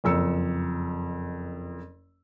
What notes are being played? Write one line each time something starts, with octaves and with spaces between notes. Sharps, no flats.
F#1 F2 E6 C#7